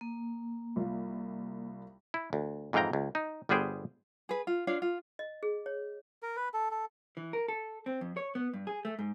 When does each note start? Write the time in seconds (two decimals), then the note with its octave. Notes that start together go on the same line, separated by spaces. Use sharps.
0.01 A#3
0.76 C2 F4
2.14 E4
2.33 D2
2.73 F2 G#2 E3 F5 G5 A#5
2.93 C#2
3.15 D#4
3.49 G1 G3 B3 G#4 C5 G5
4.29 G#4 B4
4.47 F4
4.67 D4 F4 C#5 F5
4.82 F4
5.19 D#5
5.43 G#4
5.66 C#5
6.22 A#4
6.36 B4
6.54 A4
6.71 A4
7.17 E3
7.33 A#4
7.48 A4
7.86 C4
8.01 F2
8.17 C#5
8.35 B3
8.54 G2
8.67 G#4
8.85 A3
8.99 G#2